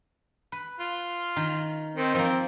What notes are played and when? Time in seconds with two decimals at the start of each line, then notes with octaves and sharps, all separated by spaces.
0.52 B4
0.79 F4
1.36 D#3
1.97 D#3 C4
2.15 F3 A#3 C4